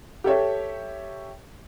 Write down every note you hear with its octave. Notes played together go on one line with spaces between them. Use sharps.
G4 A4 C#5 E5